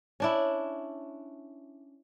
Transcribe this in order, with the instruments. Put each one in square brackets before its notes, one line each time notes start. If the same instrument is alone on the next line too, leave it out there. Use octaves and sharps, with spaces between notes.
[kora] C#4 D4 E4